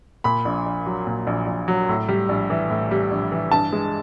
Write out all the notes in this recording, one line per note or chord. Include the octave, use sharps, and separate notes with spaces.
A#2 B5
A#1
A#1
F#3
A#2
A#1
A#1
F#3
A2
G3
A#1
E3
A2
G3
A#1
E3
G2 A5
G#3